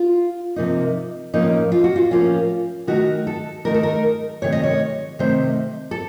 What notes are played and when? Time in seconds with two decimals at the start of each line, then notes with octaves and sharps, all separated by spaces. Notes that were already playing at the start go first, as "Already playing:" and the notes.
Already playing: F4
0.56 C3 F3 A#3 D#4
1.33 A2 F3 A#3 C#4 D#4
1.72 F4
1.84 F#4
1.96 F4
2.11 A2 F3 A#3 C#4 F4
2.87 D#3 A3 D#4 F#4
3.27 A4
3.65 D#3 A3 D#4 A#4
3.74 A4
3.83 A#4
4.42 C3 D#3 A3 C#5
4.52 D#5
4.64 C#5
5.19 C3 D#3 A3 C5
5.91 A4